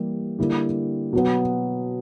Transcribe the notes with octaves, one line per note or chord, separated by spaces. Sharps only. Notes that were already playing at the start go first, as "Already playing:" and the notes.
Already playing: E3 G3 A#3 E4 G4
D3 G3 A#3 E4 G4
B2 F#3 B3